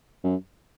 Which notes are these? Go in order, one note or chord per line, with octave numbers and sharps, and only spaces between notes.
F#2